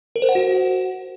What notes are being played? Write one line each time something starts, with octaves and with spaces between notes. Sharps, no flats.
A#4
C5
F#5
F#4